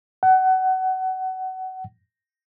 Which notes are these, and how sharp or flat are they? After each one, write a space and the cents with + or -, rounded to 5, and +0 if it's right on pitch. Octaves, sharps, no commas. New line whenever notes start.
F#5 +25